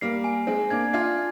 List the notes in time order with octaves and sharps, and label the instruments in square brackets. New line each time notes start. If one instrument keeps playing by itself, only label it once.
[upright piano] G3 A#3 [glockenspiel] C7
[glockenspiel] G#5
[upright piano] G#3 C4 [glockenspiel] G#5
[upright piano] A#3 D4 [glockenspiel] G#6
[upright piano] D4 F4 [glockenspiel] C7